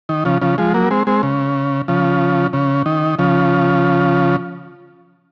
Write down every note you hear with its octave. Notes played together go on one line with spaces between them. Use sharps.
D#3
C#3 F3
C#3 F3
F3 G#3
F#3 A#3
G#3 C4
G#3 C4
C#3
C#3 F3
C#3
D#3
C#3 F3